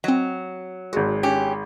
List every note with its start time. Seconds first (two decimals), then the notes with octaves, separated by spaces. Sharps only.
0.04 F#3 C4 D#5
0.93 G#1 G#3 F#4
1.23 C#4 G4